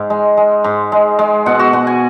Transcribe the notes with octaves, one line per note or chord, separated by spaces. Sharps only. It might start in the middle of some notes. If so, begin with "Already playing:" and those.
Already playing: G#2
G#3
G#3
G#2
G#3
G#3
B2 F#5
F#4
B2 F#5
G#5